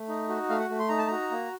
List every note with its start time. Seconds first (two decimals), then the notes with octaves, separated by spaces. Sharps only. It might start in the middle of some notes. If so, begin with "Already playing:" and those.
Already playing: A3
0.09 D#4
0.29 F#4
0.49 A3 F5
0.59 F#5
0.69 A3
0.79 C6
0.89 D#4 A#5
0.98 A5
1.07 F#4 A#5
1.31 A#3